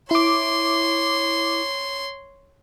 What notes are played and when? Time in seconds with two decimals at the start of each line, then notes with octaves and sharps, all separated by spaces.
0.11 E4 C#5 C6 D6